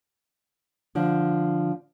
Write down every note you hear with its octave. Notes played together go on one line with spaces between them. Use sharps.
D3 F3